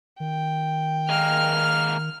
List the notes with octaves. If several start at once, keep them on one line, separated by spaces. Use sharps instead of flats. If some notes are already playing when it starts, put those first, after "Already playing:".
D#3 G5
G#3 A#3 F6